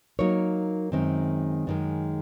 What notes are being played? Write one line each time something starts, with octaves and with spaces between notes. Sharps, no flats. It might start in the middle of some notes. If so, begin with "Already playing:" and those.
F#3 A#3 D#4 A#4 C#5
F#2 D#3 G#3 C4
F#2 D#3 G#3